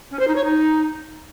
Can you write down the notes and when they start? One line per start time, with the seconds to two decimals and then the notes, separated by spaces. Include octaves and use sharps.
0.11 C#4
0.19 C5
0.27 D#4
0.35 C#5
0.44 D#4